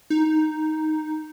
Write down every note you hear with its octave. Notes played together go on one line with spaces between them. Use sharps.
D#4